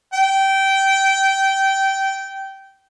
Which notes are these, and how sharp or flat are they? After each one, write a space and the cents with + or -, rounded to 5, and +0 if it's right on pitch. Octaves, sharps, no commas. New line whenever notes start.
G5 -15